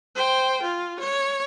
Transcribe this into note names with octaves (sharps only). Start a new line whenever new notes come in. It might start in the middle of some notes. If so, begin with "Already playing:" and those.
C5 G5
F4
C#5